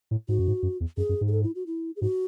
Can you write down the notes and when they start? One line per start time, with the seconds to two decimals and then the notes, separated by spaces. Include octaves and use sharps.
0.11 A2
0.29 G#2 F#4
0.39 F#2
0.48 G#2
0.63 F#2
0.80 E2
0.97 F#2 G#4
1.09 F#2
1.21 G#2
1.28 G#4
1.32 A4
1.43 E4
1.55 F#4
1.66 E4
1.96 G#4
2.02 G#2 F#4